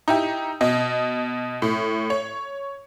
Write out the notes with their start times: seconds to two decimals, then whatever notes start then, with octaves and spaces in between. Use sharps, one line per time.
0.08 D#4 E4 G4
0.61 B2 D#5
1.62 A2
2.10 C#5